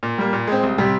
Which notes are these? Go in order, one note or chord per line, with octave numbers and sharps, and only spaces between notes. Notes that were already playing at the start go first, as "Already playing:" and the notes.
A#2
G3 A#3
A#2
G#3 C4
C2
C3 G3